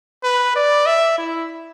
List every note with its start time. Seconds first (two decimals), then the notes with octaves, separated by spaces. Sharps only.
0.24 B4
0.56 D5
0.86 E5
1.18 E4